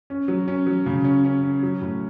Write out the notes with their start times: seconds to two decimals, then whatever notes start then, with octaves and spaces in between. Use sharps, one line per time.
0.10 C#4
0.28 F#3
0.48 C#4
0.67 F#3
0.86 C#3
1.04 C#4
1.25 C#4
1.44 C#4
1.63 F#3
1.81 A2